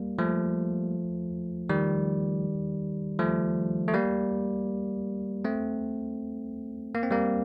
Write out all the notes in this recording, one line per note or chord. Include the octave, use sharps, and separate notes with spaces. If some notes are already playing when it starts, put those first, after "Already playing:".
Already playing: G3 A#3
F3 A3
D#3 G3
F3 A3
A3
G3 A#3
A3 C4
A#3
C4
G3 A#3